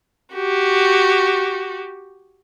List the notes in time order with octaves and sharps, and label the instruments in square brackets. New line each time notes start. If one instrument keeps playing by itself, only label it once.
[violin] F#4 G4